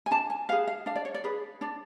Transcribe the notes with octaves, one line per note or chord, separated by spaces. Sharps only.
G#5
D4 A5
G#5
G#4 B4 F5
F5
D4 F5
D5
C#5
D5
G#4 B4
D4 D5